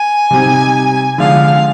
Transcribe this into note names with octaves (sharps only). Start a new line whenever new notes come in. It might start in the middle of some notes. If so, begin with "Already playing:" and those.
Already playing: G#5
C3 G3 C4 D#4 G4
D3 F3 G#3 D4 F4 F5